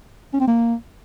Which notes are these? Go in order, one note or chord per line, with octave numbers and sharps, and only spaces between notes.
C#4
C4
A#3